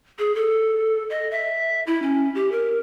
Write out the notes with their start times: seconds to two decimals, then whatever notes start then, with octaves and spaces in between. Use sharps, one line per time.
0.19 G#4
0.35 A4
1.10 D#5
1.31 E5
1.87 E4
2.02 C#4
2.35 G4
2.52 A#4